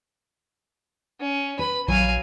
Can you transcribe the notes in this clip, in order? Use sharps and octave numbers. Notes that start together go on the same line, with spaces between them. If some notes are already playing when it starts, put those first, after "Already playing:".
C#4
B4 B5
A#1 F#3 F5 G#5